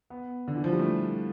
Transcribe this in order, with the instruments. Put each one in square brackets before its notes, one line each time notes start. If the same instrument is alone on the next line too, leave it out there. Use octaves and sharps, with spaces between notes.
[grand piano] B3
D3
E3
F3
G3
A3